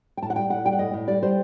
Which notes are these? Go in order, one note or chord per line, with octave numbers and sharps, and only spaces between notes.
G5
A2 A5
F#5
G3 G5
A2 F#5
G3 G5
F#5
A2 D#5
A2
G3 D5
G3 C5